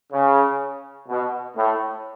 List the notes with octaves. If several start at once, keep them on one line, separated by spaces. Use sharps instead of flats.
C#3
B2
A2